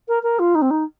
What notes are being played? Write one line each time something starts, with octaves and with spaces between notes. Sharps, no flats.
A#4
A#4
F4
D#4
C4
D#4